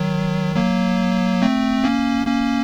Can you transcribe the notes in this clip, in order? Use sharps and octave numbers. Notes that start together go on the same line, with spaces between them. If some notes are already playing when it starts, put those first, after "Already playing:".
Already playing: D#3 F#3
F#3 A#3
A3 C4
A#3 C#4
A#3 C#4